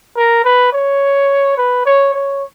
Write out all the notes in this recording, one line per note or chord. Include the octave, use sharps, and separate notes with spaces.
A#4
B4
C#5
B4
C#5
C#5